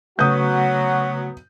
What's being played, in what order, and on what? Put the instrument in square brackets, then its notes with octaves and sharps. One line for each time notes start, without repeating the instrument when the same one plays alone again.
[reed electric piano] C#3 A3 [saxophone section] F#3 B3 [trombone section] F#4 [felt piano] D#6 G6